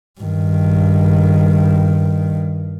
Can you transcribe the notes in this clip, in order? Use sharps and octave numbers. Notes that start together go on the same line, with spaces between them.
G2 D#3